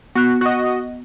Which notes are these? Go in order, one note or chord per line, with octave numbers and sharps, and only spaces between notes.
B3 F#4 F#6
F#4 D#5